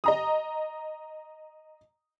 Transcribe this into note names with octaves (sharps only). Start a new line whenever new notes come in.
D#5 A#5 D#6